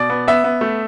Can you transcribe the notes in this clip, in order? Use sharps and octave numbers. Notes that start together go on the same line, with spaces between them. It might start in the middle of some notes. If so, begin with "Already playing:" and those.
Already playing: B2 D5
B3
B3 E5
B3
A3